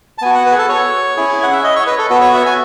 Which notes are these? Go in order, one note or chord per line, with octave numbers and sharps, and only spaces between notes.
A5
B3 F#4 G#5
F#5
B4
G#4
A4
C#5
C#4 E4 G#4
F#5
E5
D#5
C#5
B4
A4
B3 F#4 B4
C#5
E5
G#5